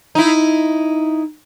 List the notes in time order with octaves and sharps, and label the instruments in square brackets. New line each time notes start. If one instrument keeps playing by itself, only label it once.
[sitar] D#4 E4